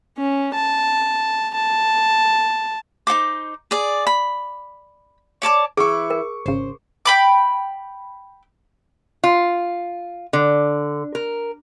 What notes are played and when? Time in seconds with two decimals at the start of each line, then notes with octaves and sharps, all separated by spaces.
0.18 C#4
0.54 A5
1.54 A5
3.07 D#4 F#4 C5 D6
3.71 G#4 D5
4.07 B5
5.42 C#5 D5 A5 D6
5.77 E3 E4 G#4 C#6 D6
6.10 A#4
6.46 G#1 C#3 C5
7.05 G5 B5 D6
9.24 F4
10.33 D3
11.15 A#4